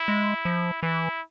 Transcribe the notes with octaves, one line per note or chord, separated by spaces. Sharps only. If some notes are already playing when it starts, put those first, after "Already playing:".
Already playing: E4
G#3
F3
E3 E4